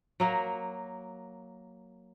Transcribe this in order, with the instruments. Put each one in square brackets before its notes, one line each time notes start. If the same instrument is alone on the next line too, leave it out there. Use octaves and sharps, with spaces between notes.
[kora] F#3 A#3 A#4